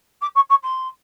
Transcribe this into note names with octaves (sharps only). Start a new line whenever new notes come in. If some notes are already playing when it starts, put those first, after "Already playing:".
D6
C#6
C#6
C6